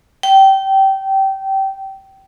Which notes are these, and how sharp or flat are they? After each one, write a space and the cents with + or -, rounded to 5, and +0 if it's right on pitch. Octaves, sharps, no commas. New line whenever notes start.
G5 -20